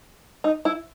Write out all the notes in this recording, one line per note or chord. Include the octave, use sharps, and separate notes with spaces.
D#4
E4